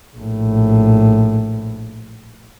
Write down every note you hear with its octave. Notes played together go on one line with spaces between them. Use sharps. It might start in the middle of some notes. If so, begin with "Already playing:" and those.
A#1 A2